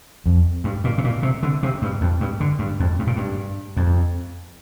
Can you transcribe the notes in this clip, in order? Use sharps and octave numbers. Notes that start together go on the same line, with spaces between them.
F2
G2
A#2
C3
A#2
C3
D3
C3
G2
F2
G2
D3
G2
F2
G2
A#2
G2
F2